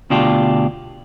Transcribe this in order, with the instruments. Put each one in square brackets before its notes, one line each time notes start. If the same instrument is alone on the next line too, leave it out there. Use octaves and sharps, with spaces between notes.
[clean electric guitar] D2 B2 D4 F4 G4